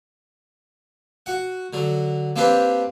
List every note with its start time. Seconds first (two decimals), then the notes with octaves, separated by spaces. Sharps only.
1.26 F#4 F#5
1.73 D3 F#3
2.36 A#3 C4 D4 G4 B4